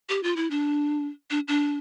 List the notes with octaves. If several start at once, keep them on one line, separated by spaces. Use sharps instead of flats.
G4
F4
E4
D4
D4
D4